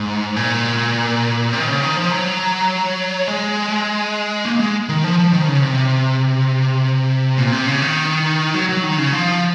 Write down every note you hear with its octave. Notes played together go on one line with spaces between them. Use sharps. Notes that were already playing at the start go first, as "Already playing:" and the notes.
Already playing: G#2
A#2
C3
D#3
C#3
D#3
F3
F#3
G#3
A#3
G#3
D#3
F3
F3
D#3
C#3
C3
A#2
C3
C#3
D#3
F#3
F#3
D#3
C#3
F3